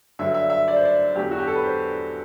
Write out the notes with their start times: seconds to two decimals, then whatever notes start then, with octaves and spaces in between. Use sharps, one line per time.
0.19 G2 D3 F#3 E5
0.34 E5
0.50 E5
0.68 D5
0.76 C5
0.85 D5
1.15 E2 D3 F#3 G4
1.31 F#4
1.39 G4
1.47 A4
1.55 B4
1.64 C5